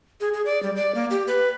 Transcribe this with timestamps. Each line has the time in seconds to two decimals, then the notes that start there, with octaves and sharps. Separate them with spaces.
0.21 G#4
0.33 G#4
0.46 D5
0.63 G3
0.76 D5
0.95 A#3
1.11 G4
1.27 B4